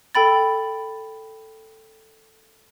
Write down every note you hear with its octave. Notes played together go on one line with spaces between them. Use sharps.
A4 G5 B5 A6